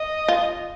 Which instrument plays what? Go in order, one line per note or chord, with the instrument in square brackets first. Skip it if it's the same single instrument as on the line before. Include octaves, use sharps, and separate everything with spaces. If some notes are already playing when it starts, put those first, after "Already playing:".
Already playing: [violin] D#5
[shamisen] F4